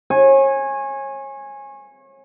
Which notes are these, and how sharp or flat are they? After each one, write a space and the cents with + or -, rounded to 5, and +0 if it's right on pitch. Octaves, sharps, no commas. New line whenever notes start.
C#5 -35 G#5 -10